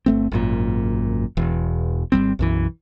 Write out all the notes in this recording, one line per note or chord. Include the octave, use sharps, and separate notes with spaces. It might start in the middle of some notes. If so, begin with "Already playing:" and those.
G1 A3 C4
G#1 F#2 A#2
E1 E2
G#1 F2 G3 C4
B1 F#2 E3